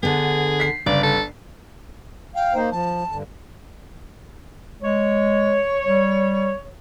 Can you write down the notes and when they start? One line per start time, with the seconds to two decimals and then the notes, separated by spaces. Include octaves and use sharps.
0.03 D3 B3 G#4
0.60 B6 C7
0.86 G1 C#3 D5
1.03 A4
2.35 F5 G5
2.55 A#3 D#4 C5
2.71 F3 A5
3.10 G2 D3
4.82 G#3 C#5
5.86 G3